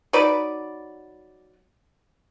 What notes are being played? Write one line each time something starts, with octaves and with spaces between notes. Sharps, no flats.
F#3 D#4 B4 D5